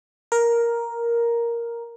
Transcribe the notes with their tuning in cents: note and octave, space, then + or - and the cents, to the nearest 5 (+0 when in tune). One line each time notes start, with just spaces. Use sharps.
A#4 +5